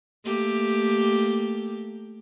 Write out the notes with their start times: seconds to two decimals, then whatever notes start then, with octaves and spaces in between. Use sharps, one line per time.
0.25 A3 A#3 G4